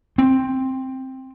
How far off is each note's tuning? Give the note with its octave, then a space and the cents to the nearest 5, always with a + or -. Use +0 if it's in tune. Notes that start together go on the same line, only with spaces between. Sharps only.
C4 +5